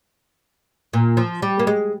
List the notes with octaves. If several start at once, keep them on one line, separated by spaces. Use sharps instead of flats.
A#2
F3
G3
A#3
G#3